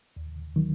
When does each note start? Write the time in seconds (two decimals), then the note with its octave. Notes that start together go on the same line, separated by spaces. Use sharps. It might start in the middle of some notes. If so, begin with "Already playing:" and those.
0.16 D#2
0.56 D#3 F#3